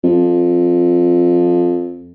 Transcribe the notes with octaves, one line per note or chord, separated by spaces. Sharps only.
F2